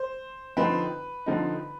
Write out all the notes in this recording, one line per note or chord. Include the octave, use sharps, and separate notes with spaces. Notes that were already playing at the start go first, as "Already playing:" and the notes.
Already playing: C5
D3 F3 C4 D#4 B4
D3 F3 C4 D#4